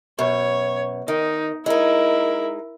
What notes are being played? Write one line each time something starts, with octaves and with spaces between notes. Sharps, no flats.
F#2 B2 C#5
D#3 D#4
G#3 D#4 E4 A#4